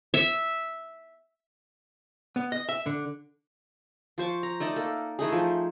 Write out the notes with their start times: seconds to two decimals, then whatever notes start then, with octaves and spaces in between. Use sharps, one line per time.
0.14 E5
2.36 B3
2.52 D#5
2.69 E5
2.86 D3
4.18 F3 C5 C#6 D6
4.43 A#5
4.60 A3 D#4 D5 D#5
4.76 A#3 A4
5.19 E3 A3 D#4 G#4
5.32 F3